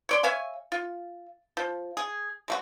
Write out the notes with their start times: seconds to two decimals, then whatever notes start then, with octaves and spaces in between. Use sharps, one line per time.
0.09 C#5 D5 C6
0.23 C#5 E5 F5 G#5
0.72 F4
1.57 F3
1.97 G#4
2.48 G#3 A3 F#4